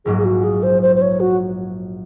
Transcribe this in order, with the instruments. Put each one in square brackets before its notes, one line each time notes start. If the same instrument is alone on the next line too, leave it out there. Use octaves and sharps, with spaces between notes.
[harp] A#1 G#2 F#3 A#3 [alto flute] G#4
[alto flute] G#4
F#4
G#4
C5
C5
C5
C#5
F#4